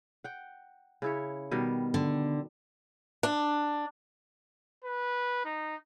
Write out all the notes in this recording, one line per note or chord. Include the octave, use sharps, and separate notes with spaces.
F#5 G5
C#3 E4 C#5
B2 D#3 G3 B3
D3
D4
B4
D#4